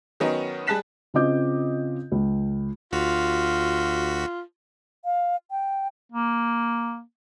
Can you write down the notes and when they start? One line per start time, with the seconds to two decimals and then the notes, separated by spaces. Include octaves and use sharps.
0.20 D#3 F#3 B3 C#4 D#4
0.67 G3 G#4 A5 F#6 B6 E7
1.14 C#3 C4 F4 D#5 D6 G6
2.12 C#2
2.92 D2 F4 F#4 B6
5.05 F5
5.51 G5
6.12 A#3